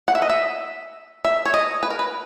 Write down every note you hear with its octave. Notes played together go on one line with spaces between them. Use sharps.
F#5
E5
D#5
E5
E5
C#5
D#5
B4
A#4
B4